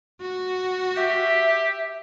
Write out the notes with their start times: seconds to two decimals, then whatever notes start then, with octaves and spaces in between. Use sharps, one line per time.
0.21 F#4
0.97 G4 E5